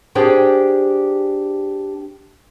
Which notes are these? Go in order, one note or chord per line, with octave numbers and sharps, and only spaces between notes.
D4 G4 G#4 C5 G5